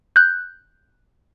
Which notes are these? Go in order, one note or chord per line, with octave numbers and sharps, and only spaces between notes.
F#6 G6